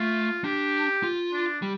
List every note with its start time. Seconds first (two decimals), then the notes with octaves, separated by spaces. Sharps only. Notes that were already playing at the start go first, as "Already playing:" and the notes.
Already playing: A3 F4
0.44 D4 G4
1.03 F4
1.32 D4
1.62 G3